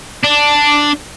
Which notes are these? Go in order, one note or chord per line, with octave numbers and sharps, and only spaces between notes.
D4